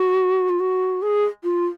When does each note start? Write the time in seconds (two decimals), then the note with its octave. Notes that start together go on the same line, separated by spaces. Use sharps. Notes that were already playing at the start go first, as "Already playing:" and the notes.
Already playing: F#4
0.49 F4
0.60 F#4
1.02 G#4
1.44 F4